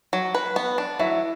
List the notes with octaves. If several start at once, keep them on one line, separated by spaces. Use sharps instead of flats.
F#3
B4
B3
D4
F#3 E4 E5